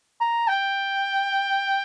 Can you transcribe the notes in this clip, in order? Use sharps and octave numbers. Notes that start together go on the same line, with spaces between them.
A#5
G5